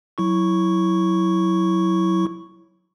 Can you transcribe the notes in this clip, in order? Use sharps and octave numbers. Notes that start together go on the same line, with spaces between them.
F#3 E4 C#6